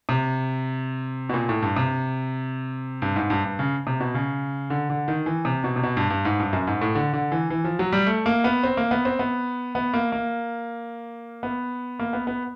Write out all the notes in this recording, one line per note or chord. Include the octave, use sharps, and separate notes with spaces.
C3
B2
A#2
A2
G2
C3
G2
G#2
G2
G2
C#3
C3
B2
C#3
D3
D3
D#3
E3
C3
B2
C3
B2
G2
G2
G#2
G2
F#2
G#2
A2
D3
D3
E3
E3
F3
F#3
G3
A3
A#3
B3
C4
A#3
B3
C4
B3
B3
A#3
A#3
B3
A#3
B3
B3